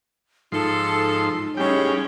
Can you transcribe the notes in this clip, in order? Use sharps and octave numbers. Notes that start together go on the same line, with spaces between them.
G#2 F3 D#4 A4 C6
A2 C#3 G3 G#3 C#4 G5